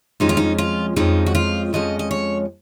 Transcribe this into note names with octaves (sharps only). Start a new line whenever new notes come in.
F2 F3 G#3 C#4 D#4
F4
D#4
F4
F2 F3 G#3 C#4 D#4
F#4
F4
F2 F3 G#3 C#4 D#5
D#5
C#5